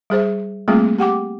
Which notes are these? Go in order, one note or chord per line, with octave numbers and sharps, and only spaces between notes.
G3 G#4 C5 E5
G3 A3 A#3 C4 F4 G#4
G4 F#5 G5 D6